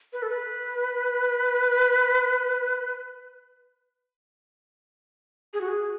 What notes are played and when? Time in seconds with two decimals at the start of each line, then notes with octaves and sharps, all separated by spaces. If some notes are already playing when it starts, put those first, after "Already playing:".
0.13 B4
0.22 A4
0.30 B4
5.54 G#4
5.61 F#4
5.69 G#4